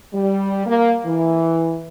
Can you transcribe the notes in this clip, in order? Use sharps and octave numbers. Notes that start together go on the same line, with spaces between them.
G3
A#3
E3